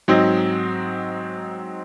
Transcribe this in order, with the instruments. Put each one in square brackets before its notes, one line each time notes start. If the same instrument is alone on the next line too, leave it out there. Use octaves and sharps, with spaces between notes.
[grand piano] G#2 F#3 C4 D#4